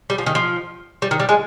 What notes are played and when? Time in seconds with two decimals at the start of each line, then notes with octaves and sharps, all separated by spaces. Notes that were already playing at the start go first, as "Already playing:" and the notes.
0.10 G3
0.18 F3
0.26 D#3
0.35 F3
1.02 G3
1.11 D#3
1.20 G3
1.29 G#3